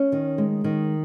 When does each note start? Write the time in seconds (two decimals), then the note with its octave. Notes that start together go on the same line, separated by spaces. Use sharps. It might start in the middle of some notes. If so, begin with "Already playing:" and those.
Already playing: C#4
0.12 D#3
0.38 G#3
0.64 D#3